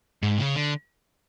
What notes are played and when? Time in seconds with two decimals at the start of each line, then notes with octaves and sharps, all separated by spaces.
0.23 G#2
0.38 C#3
0.56 D3